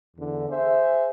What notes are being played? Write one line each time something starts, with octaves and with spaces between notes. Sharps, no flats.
E2 D3
G#4 C5 E5